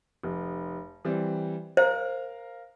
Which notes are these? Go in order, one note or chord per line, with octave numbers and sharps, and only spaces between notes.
F1
E3 G3 C4
A#4 C5 F5 A#5